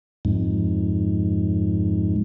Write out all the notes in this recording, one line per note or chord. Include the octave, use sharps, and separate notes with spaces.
F2 G#2